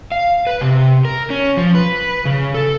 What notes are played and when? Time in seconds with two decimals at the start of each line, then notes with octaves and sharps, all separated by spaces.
0.12 F5
0.47 B4
0.61 C3
1.05 A#4
1.30 C#4
1.57 F3
1.75 B4
2.25 C#3
2.54 A4